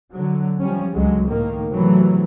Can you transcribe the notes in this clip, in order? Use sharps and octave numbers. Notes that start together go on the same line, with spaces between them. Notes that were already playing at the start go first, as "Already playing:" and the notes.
D3 F#3
F3 G3 C#4
C#2 D3 F#3 G#3
A2 D#3 A#3
C3 E3 F#3 A3